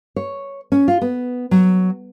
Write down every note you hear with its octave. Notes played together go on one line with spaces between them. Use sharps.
C#5
C#4
F4
B3
F#3